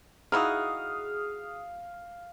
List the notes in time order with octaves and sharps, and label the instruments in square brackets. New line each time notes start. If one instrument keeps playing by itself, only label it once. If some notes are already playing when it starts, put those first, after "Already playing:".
[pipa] D#4 E4 F#4 [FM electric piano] G#4 D#6 [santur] F5